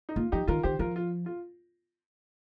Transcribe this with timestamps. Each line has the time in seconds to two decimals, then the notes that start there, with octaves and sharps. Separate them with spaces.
0.09 D#4
0.16 A#3 F4
0.32 F3 D#4 G4
0.47 D#3 F4 A#4
0.63 D#3 G4 C5
0.79 F3 F4 A#4
0.96 F4
1.26 F4